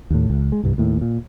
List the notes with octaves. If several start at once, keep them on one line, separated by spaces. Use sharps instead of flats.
D#2 A2
C#2
G#3
C2 G2
D#2 A2
A#2